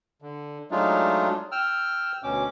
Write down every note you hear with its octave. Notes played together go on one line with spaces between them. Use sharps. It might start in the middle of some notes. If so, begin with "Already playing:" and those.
D3
F#3 G#3 A3 D4 D#4 F4
G5 E6 F6
D2 B2 C#4 D6